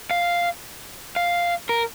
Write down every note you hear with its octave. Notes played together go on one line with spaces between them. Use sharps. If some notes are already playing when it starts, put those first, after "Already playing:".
F5
F5
A#4